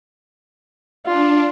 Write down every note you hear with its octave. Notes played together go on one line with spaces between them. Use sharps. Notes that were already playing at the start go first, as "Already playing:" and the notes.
D4 F4